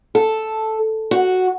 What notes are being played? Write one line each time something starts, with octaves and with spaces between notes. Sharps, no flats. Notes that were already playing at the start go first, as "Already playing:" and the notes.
A4
F#4